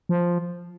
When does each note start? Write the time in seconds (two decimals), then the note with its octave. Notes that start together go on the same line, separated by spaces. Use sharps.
0.09 F3